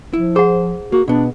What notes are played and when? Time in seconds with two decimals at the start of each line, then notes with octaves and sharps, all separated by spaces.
0.13 F3 E4
0.36 G#4 C5 F#5
0.92 A#3 F#4
1.08 B2 B3 D4